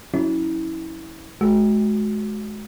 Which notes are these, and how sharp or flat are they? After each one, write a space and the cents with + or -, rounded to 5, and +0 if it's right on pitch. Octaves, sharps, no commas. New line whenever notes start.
F#3 -5 C#4 +0 E4 -25
G#3 +35 F#4 +0